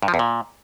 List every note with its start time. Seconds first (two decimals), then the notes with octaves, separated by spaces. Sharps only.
0.03 G2
0.08 F3
0.14 E2
0.19 A#2